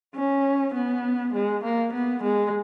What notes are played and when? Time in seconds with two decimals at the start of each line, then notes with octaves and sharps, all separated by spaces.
0.15 C#4
0.74 B3
1.34 G#3
1.64 A#3
1.93 B3
2.23 G#3